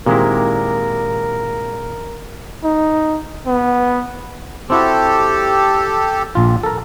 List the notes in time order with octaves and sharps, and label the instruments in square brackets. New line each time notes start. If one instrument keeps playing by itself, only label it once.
[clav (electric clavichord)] A#2 G#3 E4 [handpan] D#3 C4 G4 [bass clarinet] A#4
[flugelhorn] D#4
B3
[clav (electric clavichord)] C4 E4 F#4 [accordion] G4 A4
[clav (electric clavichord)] A#1 F4
A4 A#4